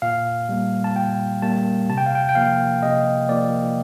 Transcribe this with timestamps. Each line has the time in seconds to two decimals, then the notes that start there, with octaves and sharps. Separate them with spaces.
0.02 A#2 F5
0.49 G3 A#3
0.84 A5
0.96 A#2 G5
1.42 G3 A#3 A5
1.89 C3 A5
1.98 G5
2.06 F5
2.15 G5
2.29 G5
2.35 F3 A#3 F5
2.82 C3 D#5
3.29 F3 A#3 D5